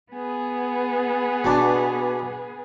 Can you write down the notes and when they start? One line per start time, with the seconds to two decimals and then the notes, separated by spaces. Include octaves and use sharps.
0.13 B3 G#4 B4
1.44 B2 D4